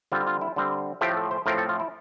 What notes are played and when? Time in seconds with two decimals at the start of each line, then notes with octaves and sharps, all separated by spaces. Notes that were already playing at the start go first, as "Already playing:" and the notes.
0.12 D3 G3 C4 F4
0.26 F4
0.41 E4
0.56 D3 G3 C4
1.01 A2 F3 A3 C4 G4
1.17 A4
1.31 C5
1.46 A2 F3 A3 C4 A#4
1.58 A4
1.69 F4
1.80 E4